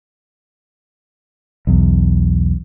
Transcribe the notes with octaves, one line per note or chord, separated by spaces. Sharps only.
B1 E2